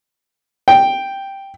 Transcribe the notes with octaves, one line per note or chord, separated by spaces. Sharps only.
G5